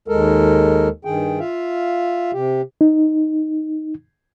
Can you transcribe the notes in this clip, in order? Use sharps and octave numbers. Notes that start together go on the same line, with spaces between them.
D#2 G#3 A4 A#4
G2 D#3 G#4 G5
F4 E5 F5
C3 G4
D#4